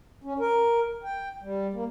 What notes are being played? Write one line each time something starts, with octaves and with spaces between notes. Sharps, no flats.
C#4
A#4
G5
G3
A#3